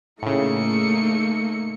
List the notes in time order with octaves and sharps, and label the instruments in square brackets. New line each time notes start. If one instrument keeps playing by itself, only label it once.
[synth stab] A2 C#3 [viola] A3 A#3 [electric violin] D#4 C#7